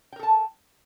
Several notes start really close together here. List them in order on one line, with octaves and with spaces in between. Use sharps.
G5 A#4 A4 A5